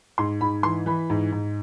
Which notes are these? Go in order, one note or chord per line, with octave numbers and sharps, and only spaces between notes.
G#2 C6
G#2 B5
E3 C6
E3 B5
G#2
G#2